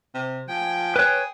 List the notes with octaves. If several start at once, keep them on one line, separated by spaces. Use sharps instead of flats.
C3
F3 G5 G#5
G#4 B4 C#5